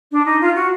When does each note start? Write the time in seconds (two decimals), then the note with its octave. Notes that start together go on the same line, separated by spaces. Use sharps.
0.11 D4
0.26 D#4
0.41 F4
0.56 F#4